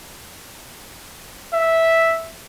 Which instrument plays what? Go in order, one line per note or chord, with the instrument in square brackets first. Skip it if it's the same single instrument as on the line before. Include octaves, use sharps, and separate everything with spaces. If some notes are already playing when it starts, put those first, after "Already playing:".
[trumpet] E5